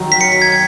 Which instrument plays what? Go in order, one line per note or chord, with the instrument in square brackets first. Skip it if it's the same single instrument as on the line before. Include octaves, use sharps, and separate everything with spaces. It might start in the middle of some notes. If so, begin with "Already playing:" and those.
Already playing: [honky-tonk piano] F#2 D#3 F#3
[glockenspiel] B6
C#7
B6
G#6
G#6